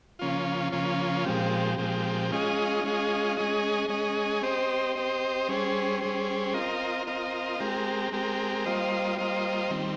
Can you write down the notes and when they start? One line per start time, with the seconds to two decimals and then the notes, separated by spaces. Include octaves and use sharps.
0.19 C#3 F3 A#3 C#4 F4
0.72 C#3 F3 A#3 C#4 F4
1.25 A#2 F3 G#3 C4 G4
1.78 A#2 F3 G#3 C4 G4
2.31 G#3 C#4 F4 G#4 D#5
2.84 G#3 C#4 F4 G#4 D#5
3.37 G#3 C#4 G#4 D#5
3.89 G#3 C#4 G#4 D#5
4.43 C4 G4 C5 D#5
4.96 C4 G4 C5 D#5
5.48 G3 C#4 G#4 C5
6.01 G3 C#4 G#4 C5
6.54 C4 F4 A#4 D#5
7.07 C4 F4 A#4 D#5
7.59 G#3 C4 G4 A#4
8.12 G#3 C4 G4 A#4
8.65 G3 A#3 F4 C5 D#5
9.19 G3 A#3 F4 C5 D#5
9.70 D#3 G3 C4